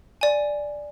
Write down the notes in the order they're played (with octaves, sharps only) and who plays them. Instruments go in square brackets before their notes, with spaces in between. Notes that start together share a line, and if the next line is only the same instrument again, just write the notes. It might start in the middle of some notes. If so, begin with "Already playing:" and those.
[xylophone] D5 G#5